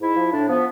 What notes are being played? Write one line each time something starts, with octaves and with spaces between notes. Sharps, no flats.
G#2 E4
F3
A2 D4
F3 B3